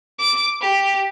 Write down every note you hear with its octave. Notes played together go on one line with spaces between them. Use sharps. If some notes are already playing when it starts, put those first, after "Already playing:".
D6
G4